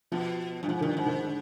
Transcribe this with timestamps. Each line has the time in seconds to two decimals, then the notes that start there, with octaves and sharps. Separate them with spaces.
0.12 B2 F3
0.63 G2
0.68 G#2 F3
0.81 G2 D#3
0.94 G#2 D3
1.06 D#3
1.25 D3